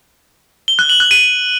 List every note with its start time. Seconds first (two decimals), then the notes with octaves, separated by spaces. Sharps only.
0.68 G7
0.79 F#6
0.89 F#7
1.00 F#6
1.11 D#7